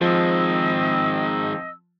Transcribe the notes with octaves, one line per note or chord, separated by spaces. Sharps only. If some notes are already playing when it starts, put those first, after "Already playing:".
D#3 F3 G#3 C4 D#5 E6